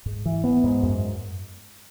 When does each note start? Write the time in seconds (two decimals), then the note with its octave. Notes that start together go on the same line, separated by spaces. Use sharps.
0.06 G#2
0.26 E3
0.44 B3
0.63 G#2
0.83 F#2